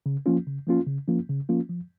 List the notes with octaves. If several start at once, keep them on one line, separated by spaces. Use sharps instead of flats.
C#3
F3 A#3 C#4 F4
C#3
F3 A#3 C#4 F4
C#3
F3 A#3 C#4 F4
C#3
F3 A#3 C#4 F4
F3